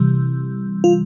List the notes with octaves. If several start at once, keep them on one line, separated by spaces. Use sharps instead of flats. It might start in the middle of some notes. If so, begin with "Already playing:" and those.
Already playing: C3 E3 G3
F4